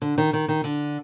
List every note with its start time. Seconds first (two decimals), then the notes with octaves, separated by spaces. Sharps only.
0.02 D3
0.18 D#3
0.33 D#3
0.48 D#3
0.64 D3